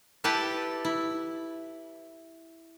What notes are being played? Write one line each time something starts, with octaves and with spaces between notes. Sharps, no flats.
E4 G4 A4 B4 G5 A5
E4